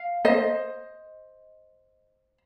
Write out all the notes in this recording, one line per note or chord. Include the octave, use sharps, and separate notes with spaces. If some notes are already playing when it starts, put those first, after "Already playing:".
Already playing: F5
C5 D#5